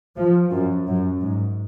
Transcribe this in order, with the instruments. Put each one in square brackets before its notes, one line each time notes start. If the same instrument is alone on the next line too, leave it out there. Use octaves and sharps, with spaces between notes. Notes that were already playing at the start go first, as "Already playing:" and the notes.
[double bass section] F3
F#2
F#2
G#2